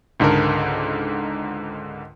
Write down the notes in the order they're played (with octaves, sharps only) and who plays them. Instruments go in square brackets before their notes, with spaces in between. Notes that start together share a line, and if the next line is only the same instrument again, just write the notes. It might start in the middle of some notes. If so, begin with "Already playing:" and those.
[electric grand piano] C#2 G#2 D3 A4 A#4